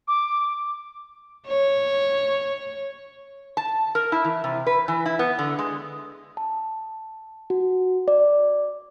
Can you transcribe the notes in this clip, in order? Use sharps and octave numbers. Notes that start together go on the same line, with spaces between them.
D6
C#5
A5
A#4
E4
E3
C3
B4
E3
E4
B3
D3
G#3
A5
F#4
D5